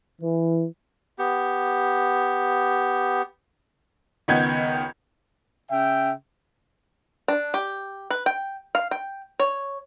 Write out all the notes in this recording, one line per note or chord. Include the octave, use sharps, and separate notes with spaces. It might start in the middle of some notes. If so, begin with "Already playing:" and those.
E3
B3 G4
C#2 D#3 B3 G6 G#6
C#3 E5 G5
D4
G4
B4
G5
F5
G5
C#5